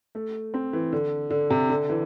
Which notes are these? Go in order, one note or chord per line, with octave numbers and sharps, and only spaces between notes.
A3
C4
E3
D3
D3
C3
D3
E3